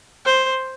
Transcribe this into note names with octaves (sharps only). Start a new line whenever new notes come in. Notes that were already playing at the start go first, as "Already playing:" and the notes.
C5